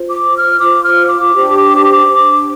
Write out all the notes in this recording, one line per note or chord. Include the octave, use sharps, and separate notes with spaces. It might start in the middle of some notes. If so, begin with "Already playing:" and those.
Already playing: F4 C5
D6
F6
F4 C5 D6
F6
D6
D4 G4 C5
D4 G4 C5